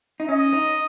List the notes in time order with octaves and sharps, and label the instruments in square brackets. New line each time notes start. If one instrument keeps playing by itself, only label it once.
[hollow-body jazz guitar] D#4
[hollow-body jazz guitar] C#4 [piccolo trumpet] D#5
[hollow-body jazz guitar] D#4